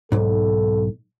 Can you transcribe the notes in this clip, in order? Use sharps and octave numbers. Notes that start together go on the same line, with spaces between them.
B1 G#2 A4